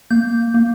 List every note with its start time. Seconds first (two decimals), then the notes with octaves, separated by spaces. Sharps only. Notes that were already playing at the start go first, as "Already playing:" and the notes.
0.10 A#3 G6
0.54 A#3